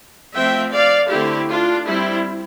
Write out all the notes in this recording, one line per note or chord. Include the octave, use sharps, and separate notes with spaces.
F3 A3 C4 E5 G5
D5 F5
D3 A3 C4 E4 G4
D4 F4
G3 C4 E4